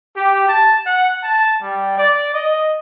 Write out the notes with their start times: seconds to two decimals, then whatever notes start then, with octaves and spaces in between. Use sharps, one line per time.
0.16 G4
0.48 A5
0.86 F#5
1.23 A5
1.62 G3
1.96 D5
2.33 D#5